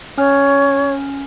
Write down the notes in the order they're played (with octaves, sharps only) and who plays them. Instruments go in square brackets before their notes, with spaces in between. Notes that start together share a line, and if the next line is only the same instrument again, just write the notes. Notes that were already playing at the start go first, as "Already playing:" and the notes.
[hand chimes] C#4 G#5 F6 [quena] C#5